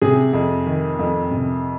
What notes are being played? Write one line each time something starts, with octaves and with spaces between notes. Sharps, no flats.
C3 G#4
F2
D#3
F2
C3